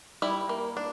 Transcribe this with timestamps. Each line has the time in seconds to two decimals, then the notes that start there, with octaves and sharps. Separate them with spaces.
0.22 G3 E4
0.49 A#3
0.77 D4